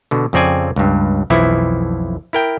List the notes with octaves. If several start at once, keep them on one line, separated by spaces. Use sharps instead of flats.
B2 D3
F2 C#3 C4 D5 G#5
C#2 G2
B1 F2 E3 F3 E4
E4 A#4 G5